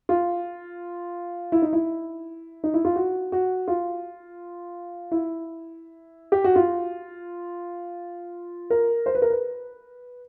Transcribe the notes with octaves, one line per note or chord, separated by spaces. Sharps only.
F4
E4
D#4
E4
D#4
E4
F4
F#4
F#4
F4
E4
G4
F#4
F4
A#4
C5
B4
A#4
B4